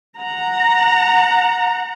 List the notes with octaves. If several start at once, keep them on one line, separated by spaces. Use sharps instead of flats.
F#5 A#5